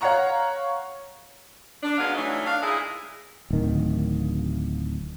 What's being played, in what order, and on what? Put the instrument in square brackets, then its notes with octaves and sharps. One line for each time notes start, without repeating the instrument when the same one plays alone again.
[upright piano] C#5 F5 F#5 A#5 C#6
[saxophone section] D4
F#3 G#3 B3 F5
E3 F#3 A3 D4 D#4
D4 F5
A#2 G#3 E4 G#4
[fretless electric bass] D1 D#3